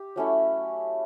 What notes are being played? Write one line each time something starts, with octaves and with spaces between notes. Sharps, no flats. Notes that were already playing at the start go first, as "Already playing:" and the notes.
Already playing: G4
F#3 A3 C#4 E4